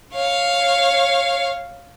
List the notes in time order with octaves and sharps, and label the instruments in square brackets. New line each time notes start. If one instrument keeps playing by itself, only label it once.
[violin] C#5 F5